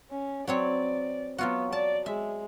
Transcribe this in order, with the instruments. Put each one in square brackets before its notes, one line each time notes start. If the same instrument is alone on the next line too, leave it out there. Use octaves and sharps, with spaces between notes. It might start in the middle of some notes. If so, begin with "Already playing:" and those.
[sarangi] C#4
[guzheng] F#3 C4 C#5 [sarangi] D5
[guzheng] F#3 F4 F#4 [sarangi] B3
[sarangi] D5 [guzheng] A5
[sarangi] G#3 [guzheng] E5